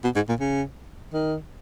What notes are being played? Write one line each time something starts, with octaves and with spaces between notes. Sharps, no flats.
B2
G#2
A#2
C#3
D#3